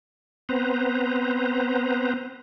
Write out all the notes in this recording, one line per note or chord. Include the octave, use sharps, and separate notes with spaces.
B3 C4 B4 C5 A#5